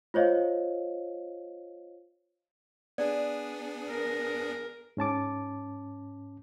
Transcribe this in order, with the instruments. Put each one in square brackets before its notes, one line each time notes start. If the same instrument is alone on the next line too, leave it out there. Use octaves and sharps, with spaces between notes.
[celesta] F4 C5 C#5 D#5 F5
[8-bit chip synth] B3 D4 G#4 [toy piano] D5
[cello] A#4
[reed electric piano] G#2 C#4 A5 D6